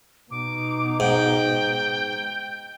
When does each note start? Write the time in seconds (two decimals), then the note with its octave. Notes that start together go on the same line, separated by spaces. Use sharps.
0.31 B2 D#4 D6
1.00 G#2 G5